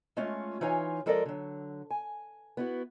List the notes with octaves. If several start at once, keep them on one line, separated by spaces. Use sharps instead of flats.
G#3 A3 C#4 F4
E3 D#4 F4 C#5 G#5
F3 G#3 A4 A#4 D5 D#5
D3 F#3
G#5
B3 E4 F#4